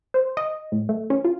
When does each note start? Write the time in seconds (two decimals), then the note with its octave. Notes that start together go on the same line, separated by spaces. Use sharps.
0.14 C5
0.37 D#5
0.72 A2
0.89 A3
1.10 C#4
1.24 F4